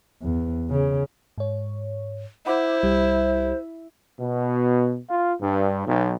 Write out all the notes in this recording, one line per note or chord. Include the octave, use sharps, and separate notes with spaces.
E2
C#3
G#2 C#5
E4 C5 F#5 B5 D6
C2 G3 G4
B2
F4
G2
B1